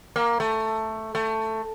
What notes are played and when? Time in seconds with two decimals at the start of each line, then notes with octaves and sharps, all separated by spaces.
0.16 A#3
0.40 A3
1.15 A3